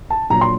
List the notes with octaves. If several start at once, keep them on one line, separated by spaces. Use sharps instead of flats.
A5
A#1 A#2 F#3 A#5
C6